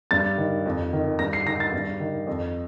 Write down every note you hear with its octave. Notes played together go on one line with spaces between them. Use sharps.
G2 A6
D#3
F2
D#3
G2 A#6
C7
D#3 A#6
A6
G2
D#3
F2